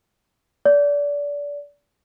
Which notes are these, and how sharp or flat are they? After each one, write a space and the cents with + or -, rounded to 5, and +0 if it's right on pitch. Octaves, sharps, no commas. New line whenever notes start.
D5 -25